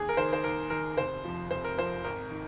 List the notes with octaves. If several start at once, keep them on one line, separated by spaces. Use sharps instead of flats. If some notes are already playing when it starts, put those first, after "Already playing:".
Already playing: D#2 G#4
A#4
D#3 C5
C5
D#2 A#4
D#3 A#4
F1 C5
F2 F3
F1 C5
A#4
F2 F3 C5
G#1 A#4
D#3